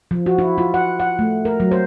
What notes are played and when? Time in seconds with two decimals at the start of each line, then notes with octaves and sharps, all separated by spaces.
0.11 F3
0.26 F#4
0.38 E4
0.58 F4
0.74 F#5
1.00 F#5
1.19 A3
1.45 A#4
1.60 F#3
1.72 C5